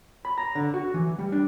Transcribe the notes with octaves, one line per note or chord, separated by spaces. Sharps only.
B5
A#5
D3
F#4
E3
G3
D4